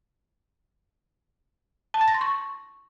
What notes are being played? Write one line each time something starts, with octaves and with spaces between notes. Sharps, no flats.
A5
A6
A#6
C6
C#6